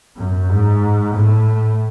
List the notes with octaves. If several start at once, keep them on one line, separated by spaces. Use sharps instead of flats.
F#2
G#2
A2